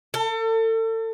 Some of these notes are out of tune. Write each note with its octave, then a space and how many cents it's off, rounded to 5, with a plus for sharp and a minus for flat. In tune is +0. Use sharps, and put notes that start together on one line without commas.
A4 +35